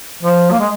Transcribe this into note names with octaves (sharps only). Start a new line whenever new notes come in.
F3
A#3
G#3